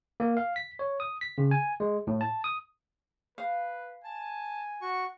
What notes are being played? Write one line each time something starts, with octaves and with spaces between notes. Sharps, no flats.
A#3
F5
B6
C#5
D#6
B6
C#3
G#5
G#3
A2
A5
D#6
B4 F5
G#5 A5
F#4 C#6